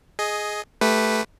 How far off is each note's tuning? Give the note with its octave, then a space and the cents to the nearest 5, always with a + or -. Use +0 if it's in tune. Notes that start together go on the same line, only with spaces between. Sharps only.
G#4 +10 D#5 +0
A3 -5 G4 +0 B4 +0